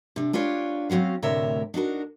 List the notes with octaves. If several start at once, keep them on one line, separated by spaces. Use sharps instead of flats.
C3 D4
D4 F4 G4 B4 C#5
F#3 C4 C#4 F#4 F5
D2 A2 C3 A#4 C#5 E5
D4 D#4 F#4 A#4